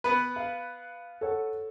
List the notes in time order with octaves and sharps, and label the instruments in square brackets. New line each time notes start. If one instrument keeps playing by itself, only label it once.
[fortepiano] B3 B4
[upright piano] F5
A4 C#5 F#5